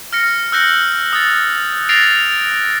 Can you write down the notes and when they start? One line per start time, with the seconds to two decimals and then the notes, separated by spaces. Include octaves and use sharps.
0.13 F6 A#6 C#7
0.52 E6 F#6 G6 A#6 C#7
1.13 D#6 A6
1.89 F#6 A6 A#6 C7 D7 F7